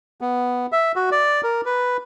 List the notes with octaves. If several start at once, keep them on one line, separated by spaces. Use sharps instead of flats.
B3
E5
F#4
D5
A#4
B4